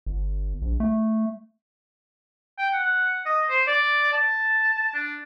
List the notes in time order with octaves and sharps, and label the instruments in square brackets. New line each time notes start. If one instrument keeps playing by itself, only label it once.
[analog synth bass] G1
A#1
A3
[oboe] G5
F#5
D#5
C5
D5
A5
D4